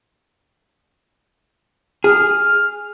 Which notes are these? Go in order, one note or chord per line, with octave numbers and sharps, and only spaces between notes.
G#4 F6